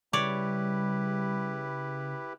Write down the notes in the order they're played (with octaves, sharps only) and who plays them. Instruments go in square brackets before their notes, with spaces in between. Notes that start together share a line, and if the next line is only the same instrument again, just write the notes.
[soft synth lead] C#3 [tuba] G3 [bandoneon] E4 G4 B4 [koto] C#5 D5